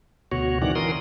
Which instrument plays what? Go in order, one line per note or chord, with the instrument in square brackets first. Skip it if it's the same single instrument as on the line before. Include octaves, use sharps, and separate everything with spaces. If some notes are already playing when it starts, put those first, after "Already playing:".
[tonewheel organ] D2 B2 F#4 C#5
G#2 C3 D#3 E3 D5 F#5
E3 A#4 C6 D#6